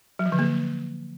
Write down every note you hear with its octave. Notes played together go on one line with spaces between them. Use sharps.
F#3
F3
D3
A#3